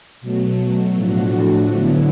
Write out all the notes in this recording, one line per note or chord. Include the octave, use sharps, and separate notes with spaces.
B2 F#3 A3
A2 F3 A3 D4 F#4
D3 F#3 B3 E4